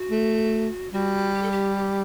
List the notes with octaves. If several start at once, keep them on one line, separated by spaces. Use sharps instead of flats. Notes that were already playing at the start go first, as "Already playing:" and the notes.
Already playing: F#4
A3
G3 F#4
G4
A4
G4
G4